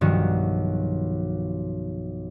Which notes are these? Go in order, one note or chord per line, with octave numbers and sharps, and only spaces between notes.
B1 G2 D#3 F3 F#4